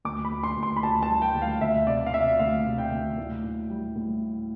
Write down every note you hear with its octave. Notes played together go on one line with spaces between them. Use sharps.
D2 D6
B5
D2
C6
D2
C6
B5
D2 A5
A5
G3
G5
D2
F5
D2 E5
C3 D5
F5
C3 E5
D2 F5
C3
G5
D2
A2
A2
G3
A2